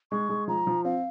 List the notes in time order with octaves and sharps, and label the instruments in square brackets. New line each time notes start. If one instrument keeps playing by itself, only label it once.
[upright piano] G#3 [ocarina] C#6
[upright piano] G#3
[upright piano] F3 [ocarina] A#5
[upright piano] F3
[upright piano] C4 [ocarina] F5